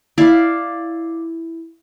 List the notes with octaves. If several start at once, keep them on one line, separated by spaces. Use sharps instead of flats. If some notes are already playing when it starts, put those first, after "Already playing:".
E4 D5 F5 D6